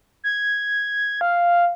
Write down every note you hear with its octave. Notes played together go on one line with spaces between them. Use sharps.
G#6
F5